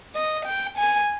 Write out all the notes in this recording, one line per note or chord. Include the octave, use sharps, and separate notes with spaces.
D#5
G5
G#5